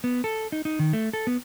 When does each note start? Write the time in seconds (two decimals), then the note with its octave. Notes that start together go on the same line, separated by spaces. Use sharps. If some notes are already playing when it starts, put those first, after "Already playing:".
0.04 B3
0.24 A4
0.52 D#4
0.65 D#4
0.79 D#3
0.93 A3
1.13 A4
1.27 B3